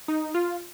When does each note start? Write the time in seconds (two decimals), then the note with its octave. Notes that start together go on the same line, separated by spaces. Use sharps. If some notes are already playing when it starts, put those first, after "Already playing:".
0.08 D#4
0.35 F4